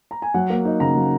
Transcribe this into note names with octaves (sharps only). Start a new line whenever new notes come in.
A#5
G#5
F#3 F#5
A#3
D#4
C#3 A#5
F#3